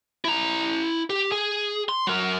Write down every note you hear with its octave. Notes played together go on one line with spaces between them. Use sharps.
E4 A#5
G4
G#4
C6
F#3 A#4